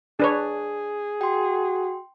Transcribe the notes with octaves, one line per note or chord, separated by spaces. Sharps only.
D4 G#4 B4 C#5
F#4 G5 C6